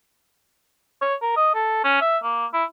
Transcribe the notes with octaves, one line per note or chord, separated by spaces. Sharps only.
C#5
A#4
D#5
A4
C#4
E5
A#3
E4